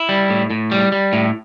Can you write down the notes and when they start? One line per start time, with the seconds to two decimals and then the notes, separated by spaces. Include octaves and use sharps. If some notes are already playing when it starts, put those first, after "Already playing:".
Already playing: E4
0.09 G3
0.30 A2
0.50 A2
0.71 G3
0.92 G3
1.13 A2